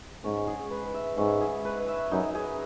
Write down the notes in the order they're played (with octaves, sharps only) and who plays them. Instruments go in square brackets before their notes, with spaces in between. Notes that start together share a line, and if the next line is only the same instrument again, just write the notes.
[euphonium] G#2 [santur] C#4
[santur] G#4
B4
E5
[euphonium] G#2 [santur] C#4
[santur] G#4
B4
E5
[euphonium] F#2 [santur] D#4
[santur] G#4